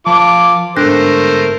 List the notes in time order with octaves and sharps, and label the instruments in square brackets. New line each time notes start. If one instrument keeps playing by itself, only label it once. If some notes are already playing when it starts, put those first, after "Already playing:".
[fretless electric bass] F3 [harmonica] F4 D6 [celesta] A5
[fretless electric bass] G1 G#2 [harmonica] A3 A#4 C5 [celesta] D4 F#6 A#6